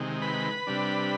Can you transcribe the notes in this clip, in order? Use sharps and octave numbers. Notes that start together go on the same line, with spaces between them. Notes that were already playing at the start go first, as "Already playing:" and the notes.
Already playing: C3 D#3 G#3
B4 B5
C3 G3 D4